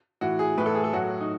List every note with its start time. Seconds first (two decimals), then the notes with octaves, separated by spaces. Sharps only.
0.21 A2 E3 F#4
0.39 G#4
0.57 A2 E3 B4
0.66 A4
0.75 G#4
0.84 A4
0.93 A2 F#3 F#4
1.21 D#4